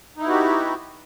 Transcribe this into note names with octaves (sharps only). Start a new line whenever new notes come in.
B3 D#4 E4 F#4 G4